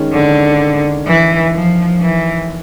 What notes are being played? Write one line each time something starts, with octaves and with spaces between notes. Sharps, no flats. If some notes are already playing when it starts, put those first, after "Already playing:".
Already playing: D#3 G#3 C#4
D3
E3
F3
E3